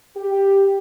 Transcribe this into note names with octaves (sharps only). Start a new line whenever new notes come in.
G4